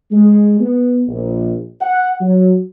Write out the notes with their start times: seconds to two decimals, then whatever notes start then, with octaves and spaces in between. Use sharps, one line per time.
0.11 G#3
0.60 B3
1.08 A#1
1.81 F#5
2.21 F#3